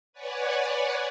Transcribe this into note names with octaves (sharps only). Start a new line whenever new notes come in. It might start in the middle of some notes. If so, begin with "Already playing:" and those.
B4 C#5 D5 F#5 G#5